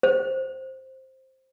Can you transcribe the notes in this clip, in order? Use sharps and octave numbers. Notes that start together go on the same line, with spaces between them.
C5